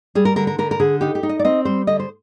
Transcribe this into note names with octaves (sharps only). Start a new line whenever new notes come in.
G3 G#4
A#4
D3 A#4
A#4
D3 A#4
A#4
D3 G#4
D#4 G4
G4
D#4
D#5
D5
C4 D#5
G3 C5
D3 D#5
C5